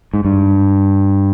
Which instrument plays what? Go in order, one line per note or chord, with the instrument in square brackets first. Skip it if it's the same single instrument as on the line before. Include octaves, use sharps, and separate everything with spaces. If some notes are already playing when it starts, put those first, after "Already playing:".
[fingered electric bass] G#2
G2